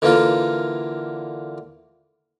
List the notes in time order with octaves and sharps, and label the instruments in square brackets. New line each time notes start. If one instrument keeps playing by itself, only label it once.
[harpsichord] D3 E3 A#3 F4